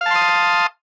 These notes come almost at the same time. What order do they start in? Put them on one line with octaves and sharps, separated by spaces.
F5 A5 C6 D#6